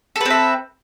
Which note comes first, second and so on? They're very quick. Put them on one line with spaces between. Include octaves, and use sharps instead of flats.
A4 B4 C4 E5